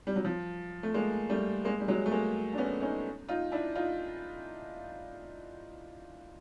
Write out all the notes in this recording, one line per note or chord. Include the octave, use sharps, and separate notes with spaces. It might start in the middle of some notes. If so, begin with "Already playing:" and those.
G3
F#3
F3
A3
G#3 A#3
G3 A3
G#3 A#3
G3
F#3 G#3
A3
G#3 A#3
D4
B3 C#4
C#4 D#4
D#4 F4
D4 E4
D#4 F4